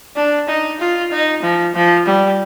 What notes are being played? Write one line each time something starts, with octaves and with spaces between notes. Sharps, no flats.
D4
D#4
F4
D#4
F3
F3
G3